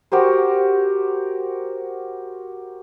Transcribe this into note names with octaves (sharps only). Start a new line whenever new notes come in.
F#4 G4 A#4 C5